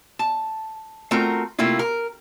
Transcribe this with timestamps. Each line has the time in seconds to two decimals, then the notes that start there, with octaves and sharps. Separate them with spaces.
0.19 A5
1.11 A3 C4 F4 F#4 A#4 A#5
1.59 C3 A3 A#3 E4 F4
1.79 A#4